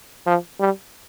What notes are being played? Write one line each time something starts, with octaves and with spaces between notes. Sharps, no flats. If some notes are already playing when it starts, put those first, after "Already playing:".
F3
G3